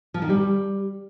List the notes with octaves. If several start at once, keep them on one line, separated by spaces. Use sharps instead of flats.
F3
D#3
G3